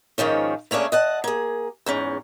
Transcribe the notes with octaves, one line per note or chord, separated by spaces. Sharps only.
G#2 D#3 F3 C#4
A3 A#3 C#4 D4 G#4
D#5 F#5 A5
A#3 G#4
E2 G#2 C#4